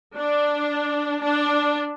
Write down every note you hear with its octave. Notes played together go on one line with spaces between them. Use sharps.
D4
D4